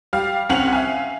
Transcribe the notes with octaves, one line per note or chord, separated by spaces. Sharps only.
G3 F5 F6
C2 C4 C#4 F#5 F7 F#7
E5 F5 G#5